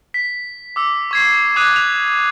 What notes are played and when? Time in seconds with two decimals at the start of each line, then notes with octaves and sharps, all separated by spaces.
0.14 B6
0.76 D6 E6
1.11 C#6 G#6 C7
1.56 D6 D#6 F#6 G#6 D#7
1.76 F7